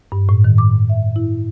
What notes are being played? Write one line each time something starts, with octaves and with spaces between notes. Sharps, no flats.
G2
A2
D#3
D6
E5
E4